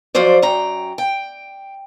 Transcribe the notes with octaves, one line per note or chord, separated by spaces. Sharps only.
F2 F3 F#3 C5 D5
F#2 G5 A#5
G5